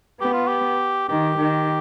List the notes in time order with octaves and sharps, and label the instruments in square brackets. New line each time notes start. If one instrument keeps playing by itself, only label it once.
[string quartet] B3 [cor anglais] G4
[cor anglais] F4
G4
[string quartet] D#3 [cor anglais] G4
[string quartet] D#3